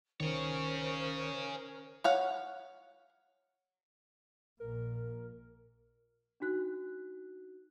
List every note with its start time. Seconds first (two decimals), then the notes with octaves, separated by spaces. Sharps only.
0.20 C2 D#3 C#4 G#4 A#4 C5 C#5
2.04 C#5 F5 F#5
4.60 A#1 A#2 A#4
6.40 D4 D#4 F#4 F#6